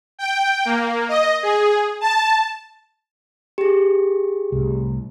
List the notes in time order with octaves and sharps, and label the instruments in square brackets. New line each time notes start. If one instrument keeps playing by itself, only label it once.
[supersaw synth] G5
A#3
D#5
G#4
A5
[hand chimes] G4 G#4
[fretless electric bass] C2 A2